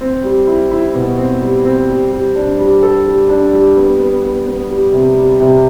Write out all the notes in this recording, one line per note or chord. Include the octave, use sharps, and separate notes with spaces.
C4
G3
E4
E4
B2
C4
G3
C4
G3
G3
D4
G3
A4
G3
D4
G3
B3
B3
B3
B3
G3
C3
G3
C3